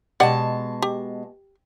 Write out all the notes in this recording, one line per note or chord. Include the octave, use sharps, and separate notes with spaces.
B2 G#3 G4 D5 F#5 A5
G4